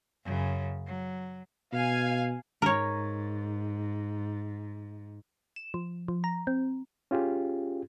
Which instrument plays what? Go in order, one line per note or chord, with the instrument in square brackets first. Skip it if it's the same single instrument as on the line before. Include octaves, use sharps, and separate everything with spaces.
[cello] F#2 C#3
F#3
[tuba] B2 [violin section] F5 G#5
[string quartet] G#2 [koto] A#4 C#5
[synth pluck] E7
F3
F3
A#5
C4
[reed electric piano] C#4 F4 G4 G#4